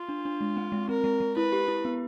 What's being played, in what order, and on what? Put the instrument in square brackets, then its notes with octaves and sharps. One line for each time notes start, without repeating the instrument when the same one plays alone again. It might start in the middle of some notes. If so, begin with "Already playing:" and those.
Already playing: [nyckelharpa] F4
[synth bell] D4
D4
G#3
C4
G#3
[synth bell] C4 [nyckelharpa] A#4
[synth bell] G#3
G#3
[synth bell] E4 [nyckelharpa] B4
[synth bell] G4
E4
B3